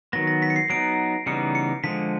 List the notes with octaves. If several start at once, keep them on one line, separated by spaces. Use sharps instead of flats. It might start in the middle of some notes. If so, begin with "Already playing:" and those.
D#3 F#3 B3 A#6
A#6
B6
C#7
C7
F#3 B3 D#4 D7
C#3 E3 G3 B3 D#4 C#7
C#7
D3 F3 G#3 B6